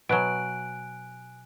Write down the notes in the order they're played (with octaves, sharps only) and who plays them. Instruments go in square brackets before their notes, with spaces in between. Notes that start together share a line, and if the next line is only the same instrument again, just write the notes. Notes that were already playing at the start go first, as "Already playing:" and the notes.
[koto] B2 F#3 [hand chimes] G#5 F#6 D7